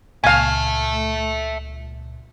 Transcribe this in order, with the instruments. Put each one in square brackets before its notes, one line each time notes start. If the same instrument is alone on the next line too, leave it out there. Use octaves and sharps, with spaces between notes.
[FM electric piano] C#2 A#2 [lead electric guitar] E5 A5 [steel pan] F5 G#5